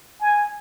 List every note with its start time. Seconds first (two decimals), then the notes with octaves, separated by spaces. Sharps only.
0.21 G#5